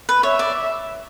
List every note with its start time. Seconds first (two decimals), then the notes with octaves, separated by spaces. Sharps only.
0.09 B4
0.23 C#5 E5
0.39 D5